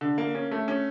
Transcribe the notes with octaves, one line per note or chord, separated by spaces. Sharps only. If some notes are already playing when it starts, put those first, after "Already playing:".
D3
A#3
C#4
A3
C#4